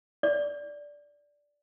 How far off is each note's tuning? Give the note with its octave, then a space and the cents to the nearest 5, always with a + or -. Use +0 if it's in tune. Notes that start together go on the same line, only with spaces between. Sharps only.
D5 -10